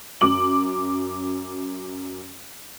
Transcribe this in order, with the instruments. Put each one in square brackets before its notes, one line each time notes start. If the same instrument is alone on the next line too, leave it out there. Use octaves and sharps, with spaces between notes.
[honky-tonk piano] F#2 D6 F#7